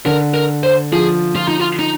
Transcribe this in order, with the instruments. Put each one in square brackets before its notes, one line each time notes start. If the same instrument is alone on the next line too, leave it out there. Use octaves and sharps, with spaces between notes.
[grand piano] D3 [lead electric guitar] A#4
[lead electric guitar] A#4
C5
[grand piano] F3 [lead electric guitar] G#4
[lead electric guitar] F4
D#4
F4
D#4